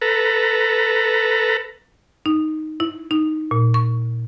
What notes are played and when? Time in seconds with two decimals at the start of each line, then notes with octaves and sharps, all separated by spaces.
0.01 A4 B4 A#5
2.26 D#4
2.80 E4
3.11 D#4
3.51 A#2
3.74 C#6